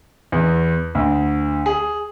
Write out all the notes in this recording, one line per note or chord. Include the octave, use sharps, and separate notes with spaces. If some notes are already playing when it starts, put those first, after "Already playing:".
E2
D2
G#4